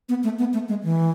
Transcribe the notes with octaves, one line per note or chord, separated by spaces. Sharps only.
B3
A3
B3
A3
G#3
E3